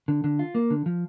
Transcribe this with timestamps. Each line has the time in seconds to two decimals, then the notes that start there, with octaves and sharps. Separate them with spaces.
0.08 D3
0.24 D3
0.39 F4
0.55 A#3
0.70 D3
0.86 F3